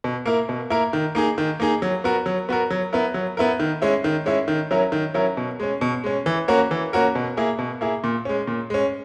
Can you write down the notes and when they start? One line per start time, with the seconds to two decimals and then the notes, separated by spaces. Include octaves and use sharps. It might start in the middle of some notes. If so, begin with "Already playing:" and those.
0.04 B2
0.25 A#3 E4 A#4
0.49 B2
0.70 A#3 E4 A#4
0.93 D#3
1.15 A#3 D#4 G#4
1.38 D#3
1.60 A#3 D#4 G#4
1.82 F#3
2.04 B3 F#4 A#4
2.26 F#3
2.49 B3 F#4 A#4
2.70 F#3
2.93 B3 E4 A#4
3.14 F#3
3.37 B3 E4 A#4
3.60 D#3
3.82 G#3 C#4 E4
4.04 D#3
4.26 G#3 C#4 E4
4.48 D#3
4.71 F#3 C#4 E4 A#4
4.92 D#3
5.14 F#3 C#4 E4 A#4
5.37 B2
5.60 G#3 C#4
5.81 B2
6.04 G#3 C#4
6.26 E3
6.48 A#3 C#4 F#4 A#4
6.71 E3
6.93 A#3 C#4 F#4 A#4
7.15 B2
7.37 A#3 E4 G#4
7.59 B2
7.81 A#3 E4 G#4
8.04 A#2
8.25 G#3 C#4
8.47 A#2
8.70 G#3 C#4